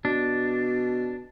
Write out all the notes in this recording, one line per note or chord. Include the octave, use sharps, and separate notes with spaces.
B2 D4